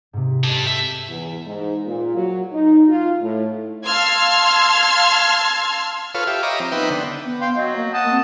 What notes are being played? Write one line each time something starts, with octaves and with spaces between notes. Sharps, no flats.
G#2 C3
G4 A4 D#5 A5
E5
E2
G#2
A#2
F#3
D#4
F4
A2
F5 A5 C6 E6 F6 G#6
F4 A4 B4 C#5 F5
G4 E5 F5
C#5 D#5 E5 A#5 B5 D6
F3 C4
B3 D#4 B4 C5 E5 G5
D3 B3
B3
F5 G5 C6
F#3 D#5
A#3
D#5 F#5 A5
C4